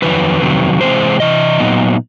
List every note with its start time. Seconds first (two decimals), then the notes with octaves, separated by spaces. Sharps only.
0.02 F2 C3 D#3 F#3 B4
0.42 F2 C3 D#3 F#3
0.81 C3 E3 G#3 C4 E4 C5
1.20 C3 E3 D#5
1.59 A#2 F#3 B3 D#4